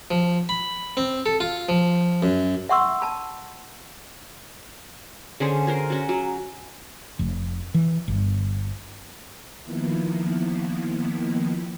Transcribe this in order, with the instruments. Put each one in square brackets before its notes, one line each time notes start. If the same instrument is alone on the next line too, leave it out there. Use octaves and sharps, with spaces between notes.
[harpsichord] F3
B5
C4
A4
F4
F3
F#2
[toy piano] E5 F#5 C6 C#6 E6
A5 B5
[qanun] D3 C#4 G#4 C5
G#4 A#4 C5
C#4 F#4
F#3
[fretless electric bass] F1
E3
G1
[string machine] D#3 F3 A#3 B3 E4